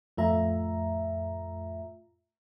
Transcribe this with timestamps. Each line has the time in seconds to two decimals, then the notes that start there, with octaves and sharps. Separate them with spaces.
0.17 F2 A2 A3 F4 E5 A#5